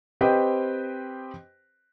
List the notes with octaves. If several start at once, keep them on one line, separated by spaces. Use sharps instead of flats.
C4 G4 B4 C5 D#5 G5